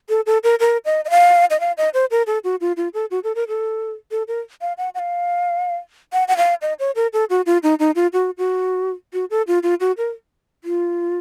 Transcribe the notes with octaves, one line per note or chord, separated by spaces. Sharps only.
A4
A4
A#4
A#4
D#5
D#5
F5
D#5
F5
D#5
C5
A#4
A4
F#4
F4
F4
A4
F#4
A4
A#4
A4
A4
A#4
F5
F#5
F#5
F5
F#5
F#5
F5
D#5
C#5
A#4
A4
F#4
F4
D#4
D#4
F4
F#4
F#4
F#4
A4
F4
F4
F#4
A#4
F4